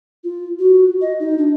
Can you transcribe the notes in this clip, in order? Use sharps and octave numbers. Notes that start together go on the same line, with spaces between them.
F4
F#4
D#5
D#4
D4